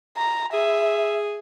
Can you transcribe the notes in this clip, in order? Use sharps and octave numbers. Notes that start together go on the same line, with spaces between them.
A#5
G#4 E5